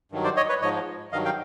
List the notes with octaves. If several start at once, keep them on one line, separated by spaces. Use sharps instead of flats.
G2 D#3 F#3
C5 D5
C#5 D#5
B4 C#5
G#2 F3 C#5 D#5
G2 D#3 F#3 D#5 F5
F5 G5